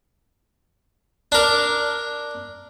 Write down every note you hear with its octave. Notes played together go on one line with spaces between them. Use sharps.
D4 A#4